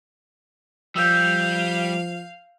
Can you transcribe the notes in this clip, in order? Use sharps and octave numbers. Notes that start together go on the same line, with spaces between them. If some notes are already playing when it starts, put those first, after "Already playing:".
F3 G3 F5 E6 G6